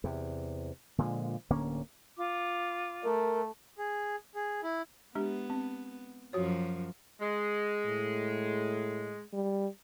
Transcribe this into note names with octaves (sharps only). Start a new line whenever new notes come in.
E2 C3
A#2 D3 F3 G#3
D1 D3 A#3 C#4
F4 D6
A3 A#4
G#4
G#4
E4
G#3 B3 D4 G4
C4
F#2 F3 F#4 C#5
G#3
A2
G3